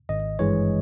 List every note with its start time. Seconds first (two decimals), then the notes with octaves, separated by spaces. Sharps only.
0.09 G#1 D#5
0.39 G2 E3 G#3 C#5